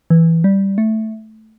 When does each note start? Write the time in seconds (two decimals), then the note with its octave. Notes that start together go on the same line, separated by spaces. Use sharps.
0.10 E3
0.44 G3
0.78 A3